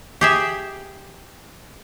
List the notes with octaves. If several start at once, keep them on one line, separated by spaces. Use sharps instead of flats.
G4 G#4 E5